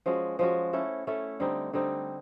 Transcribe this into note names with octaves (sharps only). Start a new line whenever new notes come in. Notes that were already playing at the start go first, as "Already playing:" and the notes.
F3 G#3 C#4 F#4
F3 G#3 C#4 F#4
A3 C#4 E4 A4
A3 C#4 E4 A4
D3 G3 C4 D#4
D3 G3 C4 D#4